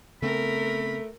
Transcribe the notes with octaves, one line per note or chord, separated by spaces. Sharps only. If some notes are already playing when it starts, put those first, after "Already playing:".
C#3 A3 B3 C4 A#4 B5